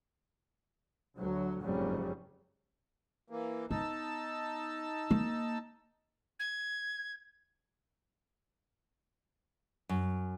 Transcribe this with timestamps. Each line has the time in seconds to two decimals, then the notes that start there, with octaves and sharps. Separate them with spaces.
1.17 D2 F#3
1.63 F#1 F2 G#2 C#3 F#3 G3
3.30 E3 A#3
3.71 B3 D#4 A5 E6
5.11 A#3
6.39 G#6
9.89 F#2